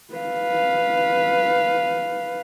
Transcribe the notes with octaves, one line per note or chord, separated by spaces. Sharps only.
B4 F5